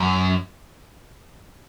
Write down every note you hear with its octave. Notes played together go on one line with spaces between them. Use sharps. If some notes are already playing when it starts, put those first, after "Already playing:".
Already playing: F#2